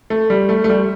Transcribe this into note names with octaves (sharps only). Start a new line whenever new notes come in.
A3
G3
A3
A3
G3